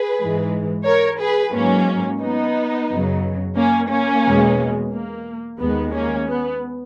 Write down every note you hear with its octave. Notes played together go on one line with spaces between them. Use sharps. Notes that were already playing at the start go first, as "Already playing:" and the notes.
Already playing: G#4 B4
G#2 E3 G#3
A#4 C#5
G#4 B4
G#2 F#3 A#3 C#4
B3 D#4
F#2 C#3 F#3
A#3 C#4
A#3 C#4
E2 B2 G#3
A#3
D#2 D#3 G#3 B3
A#3 C#4
B3